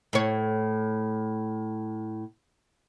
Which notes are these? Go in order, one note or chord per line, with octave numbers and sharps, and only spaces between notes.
A2 C#5